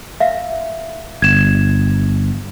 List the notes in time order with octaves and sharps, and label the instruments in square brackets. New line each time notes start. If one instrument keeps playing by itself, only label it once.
[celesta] E5 F5
[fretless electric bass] G1 [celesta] G#6 E7